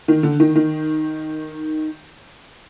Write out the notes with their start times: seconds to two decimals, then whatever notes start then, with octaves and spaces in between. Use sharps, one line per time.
0.08 D#3
0.23 D3
0.40 D#3
0.55 D#3